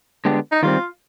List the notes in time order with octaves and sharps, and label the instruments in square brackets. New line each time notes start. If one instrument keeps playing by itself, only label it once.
[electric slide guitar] D3 G#3 B3 D4 G4
[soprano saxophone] D#4
[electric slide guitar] D#3 G3 C4 [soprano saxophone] F4